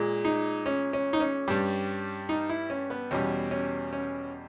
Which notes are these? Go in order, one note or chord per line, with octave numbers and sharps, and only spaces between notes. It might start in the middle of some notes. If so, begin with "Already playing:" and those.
Already playing: A#2 G#3
D#4
C#4
C#4
D#4
C#4
G2 G3
D#4
E4
C#4
B3
E2 B2 G3 C#4
C#4
C#4